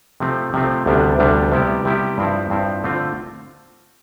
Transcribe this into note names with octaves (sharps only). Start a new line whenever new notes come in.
C3 F3 A3 C4
C3 F3 A3 C4
D2 C3 G3 B3 D4
D2 C3 G3 B3 D4
C3 G3 B3 E4 G4
C3 G3 B3 E4 G4
G2 F3 C4 E4
G2 F3 C4 E4
D3 A3 C4 F4